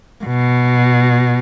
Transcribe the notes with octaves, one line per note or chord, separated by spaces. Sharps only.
B2